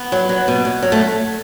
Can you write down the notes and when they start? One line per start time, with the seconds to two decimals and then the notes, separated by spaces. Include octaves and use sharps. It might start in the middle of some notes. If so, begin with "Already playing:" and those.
Already playing: B3
0.12 F#3
0.29 F#3
0.48 B2
0.65 B2
0.82 F#3
0.92 A3